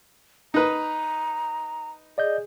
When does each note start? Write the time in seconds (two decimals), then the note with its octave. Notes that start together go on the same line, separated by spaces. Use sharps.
0.54 D#4 B4 A#5
2.18 G#4 D5 D#5 G6